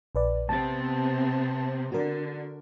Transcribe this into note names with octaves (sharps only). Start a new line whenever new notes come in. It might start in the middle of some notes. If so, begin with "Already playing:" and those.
A#1 B4 D5
C3 B3 C4 A5 A6
D3 F#4 A#4